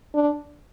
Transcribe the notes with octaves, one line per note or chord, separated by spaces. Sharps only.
D4